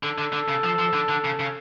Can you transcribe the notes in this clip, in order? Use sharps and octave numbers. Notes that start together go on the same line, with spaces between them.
D3 A4
D3
D3
C#3
F3
F3
D3
D3
C#3
C#3